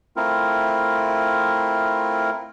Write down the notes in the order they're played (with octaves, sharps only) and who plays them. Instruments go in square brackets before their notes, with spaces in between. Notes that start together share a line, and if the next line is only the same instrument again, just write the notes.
[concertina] A3 C4 E4 F4 A#4